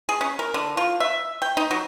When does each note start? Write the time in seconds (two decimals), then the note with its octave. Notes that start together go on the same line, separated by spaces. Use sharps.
0.09 G#4
0.21 C#4
0.39 A#4
0.54 D3
0.77 F4
1.00 E5
1.42 G5
1.57 D#4
1.71 F#3